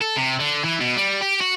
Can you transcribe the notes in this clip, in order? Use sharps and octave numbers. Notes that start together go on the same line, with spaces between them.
A4
C3
D3
E3
B2
G3
G4
F#4